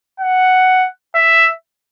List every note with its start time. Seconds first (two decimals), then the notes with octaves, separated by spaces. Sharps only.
0.20 F#5
1.15 E5